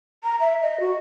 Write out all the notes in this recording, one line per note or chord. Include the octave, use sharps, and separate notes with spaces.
A#5
E5
D#5
F#4